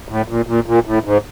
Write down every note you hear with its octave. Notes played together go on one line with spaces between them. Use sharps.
A2
A#2
A#2
A#2
A2
G#2